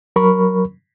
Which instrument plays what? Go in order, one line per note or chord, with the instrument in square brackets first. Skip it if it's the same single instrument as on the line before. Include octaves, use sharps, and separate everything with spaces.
[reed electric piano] F#3 A#4 B5 C#6